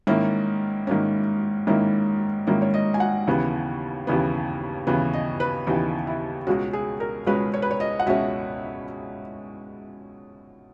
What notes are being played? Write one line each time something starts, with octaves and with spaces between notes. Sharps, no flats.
G#2 D#3 A#3 C#4 E4
G#2 D#3 A#3 C#4
G#2 D#3 A#3 C#4 E4
G#2 D#3 A#3 C#4 E4
C#5
D#5
G#5
F#5
D#2 C#3 E3 B3
D#2 C#3 E3 B3
D#2 C#3 E3 B3
D#5
B4
D#2 C#3 E3 B3 D#4
E4
C#2 B2 G#3 C#4 F#4
G#4
A#4
C#2 B2 G#3 C#4 B4
C#5
B4
C#5
D#5
F#5
C#2 B2 G#3 C#4 E5